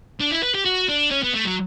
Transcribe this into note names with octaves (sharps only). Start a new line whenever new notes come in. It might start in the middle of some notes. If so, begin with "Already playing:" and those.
D4
E4
B4
G4
F#4
D4
C#4
B3
A3
F#3